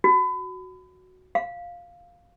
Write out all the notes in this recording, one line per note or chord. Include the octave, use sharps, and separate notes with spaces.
F#4
F5